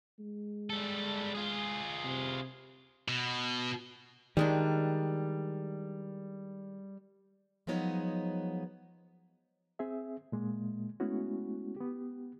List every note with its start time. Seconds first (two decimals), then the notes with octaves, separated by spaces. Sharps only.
0.19 G#3
0.70 G3 A4
1.35 F4 G#4
2.04 C3
3.08 B2
4.37 D#3 G3 G#3 D4
7.67 F3 F#3 G#3 B3 D#4 C#5
9.79 C4 G#4 E5
10.32 A#2 G#3 A#3
11.00 G#3 A3 B3 C#4 E4 F#4
11.76 B3 G4